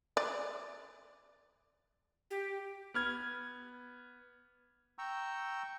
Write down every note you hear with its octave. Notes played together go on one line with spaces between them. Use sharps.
D5
G4
B3 F6 G#6
G5 A#5 C#6 E6